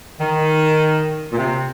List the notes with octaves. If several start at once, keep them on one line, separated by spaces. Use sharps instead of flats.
D#3
A#2
C3